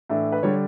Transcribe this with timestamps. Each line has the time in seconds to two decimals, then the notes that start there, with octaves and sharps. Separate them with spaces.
0.10 A2 E3 A3 D4
0.32 B4
0.43 D3 G3 D4 C#5